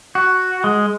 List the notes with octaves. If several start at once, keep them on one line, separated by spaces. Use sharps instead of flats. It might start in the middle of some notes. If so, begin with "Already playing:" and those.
F#4
G#3